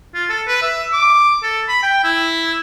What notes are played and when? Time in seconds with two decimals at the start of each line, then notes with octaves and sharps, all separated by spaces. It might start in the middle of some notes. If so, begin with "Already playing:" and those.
0.14 F4
0.30 A4
0.48 B4
0.62 E5
0.93 D6
1.43 A4
1.68 B5
1.83 G5
2.04 E4